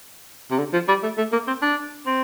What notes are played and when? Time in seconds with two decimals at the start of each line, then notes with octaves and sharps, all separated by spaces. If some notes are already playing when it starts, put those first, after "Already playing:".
0.51 C3
0.58 D3
0.73 F3
0.88 G3
1.03 A3
1.18 A3
1.32 A#3
1.47 C4
1.62 D4
2.06 C4